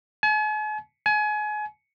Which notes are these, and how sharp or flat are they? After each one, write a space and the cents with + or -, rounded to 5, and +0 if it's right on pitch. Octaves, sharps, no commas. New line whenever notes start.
G#5 +45
G#5 +30